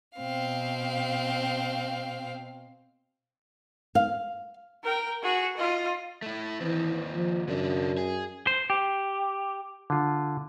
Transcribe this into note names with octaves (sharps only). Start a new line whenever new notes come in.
B2 C4 F5
F5
A#4 G5
F#4 G#4
F4 D#5
A3 E4
D#2 E3 C4
F3
F#2 C#3 D4
G#4
C5
G4
D3 F4